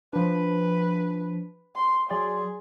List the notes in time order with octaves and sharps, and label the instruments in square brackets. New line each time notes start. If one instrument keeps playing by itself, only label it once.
[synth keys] F3 D4 [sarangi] B4
[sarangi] C6
[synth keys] F#3 D5 C6 [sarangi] G#4